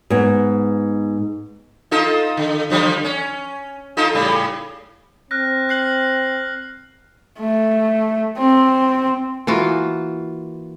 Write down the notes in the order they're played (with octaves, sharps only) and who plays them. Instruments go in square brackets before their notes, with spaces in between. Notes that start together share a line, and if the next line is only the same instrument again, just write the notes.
[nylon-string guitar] G#2 B3
[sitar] D#4 F4 A4
D3
D3 F3 G3
C#4
D#4 F4 A4
A2 C#3 G3
[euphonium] C4 [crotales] F6 F#6 A#6
[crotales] F#6 C7 F#7
[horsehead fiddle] A3
C4
[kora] E3 A#3 F4 F#4